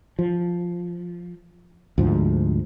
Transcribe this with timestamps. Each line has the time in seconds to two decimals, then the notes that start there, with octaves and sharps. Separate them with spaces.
0.19 F3
1.98 D2 G#2 F3